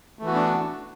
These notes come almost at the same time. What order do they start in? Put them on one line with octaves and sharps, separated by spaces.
A3 E3 F#4 B3 D4